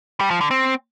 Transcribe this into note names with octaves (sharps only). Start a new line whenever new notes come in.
G3
F3
D3
C4